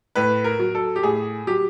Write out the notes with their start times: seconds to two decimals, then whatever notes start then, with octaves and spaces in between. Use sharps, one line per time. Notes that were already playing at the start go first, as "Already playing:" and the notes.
0.15 A2 B4
0.44 A#4
0.59 F#3
0.75 A4
0.96 G4
1.03 A2 G#4
1.47 F#3 G4